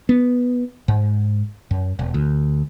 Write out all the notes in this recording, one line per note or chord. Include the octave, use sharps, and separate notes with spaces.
B3
G#2
F#2
E1
D2